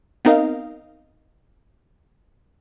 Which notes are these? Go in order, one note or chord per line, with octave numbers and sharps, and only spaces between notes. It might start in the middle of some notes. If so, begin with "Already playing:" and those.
B3 C4 D#4 A#4 D#5 F5